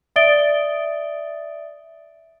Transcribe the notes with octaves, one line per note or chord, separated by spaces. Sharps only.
D5 E5 D#6 A6 D7 G7